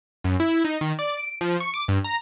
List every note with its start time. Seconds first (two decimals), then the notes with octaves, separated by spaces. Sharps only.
0.24 F#2
0.40 E4
0.65 D#4
0.81 D#3
0.99 D5
1.18 D7
1.41 F3
1.60 C#6
1.74 D6
1.88 G2
2.04 A#5